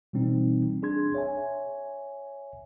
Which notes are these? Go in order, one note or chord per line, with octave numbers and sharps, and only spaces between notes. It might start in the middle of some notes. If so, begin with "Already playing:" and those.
B2 E3 G3 C4 D#4
D4 G#4 C6 G#6
C#5 E5 G#5